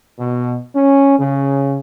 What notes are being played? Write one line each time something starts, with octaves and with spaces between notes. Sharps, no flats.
B2
C#4
C#3